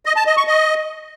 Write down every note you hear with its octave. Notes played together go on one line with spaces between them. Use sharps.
D#5
A5
D#5
C#6
D#5